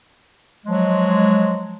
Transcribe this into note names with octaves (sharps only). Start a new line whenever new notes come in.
F3 F#3 G#3